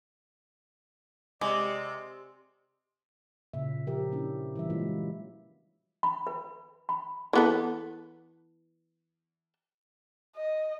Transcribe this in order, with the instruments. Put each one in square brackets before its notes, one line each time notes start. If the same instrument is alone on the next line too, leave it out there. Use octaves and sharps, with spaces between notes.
[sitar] C3 [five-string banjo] G#3 [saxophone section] D5 [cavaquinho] D6
[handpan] A#2 C#3 E5
F3 G4 A#4 E5
A#3 C#4 D4 E4
E3 G3 E5
F#3 G#3 A#3 E4 F4
[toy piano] B5
B4
B5
[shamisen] E3 B3 A4
[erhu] D#5